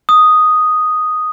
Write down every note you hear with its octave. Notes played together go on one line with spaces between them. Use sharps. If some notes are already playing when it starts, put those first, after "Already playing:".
D#6